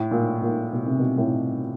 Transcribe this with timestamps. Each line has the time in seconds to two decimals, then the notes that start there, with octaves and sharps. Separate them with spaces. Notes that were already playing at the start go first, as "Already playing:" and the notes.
Already playing: A2
0.11 A#2
0.42 A#2
0.73 B2
0.86 C3
0.99 B2
1.18 A2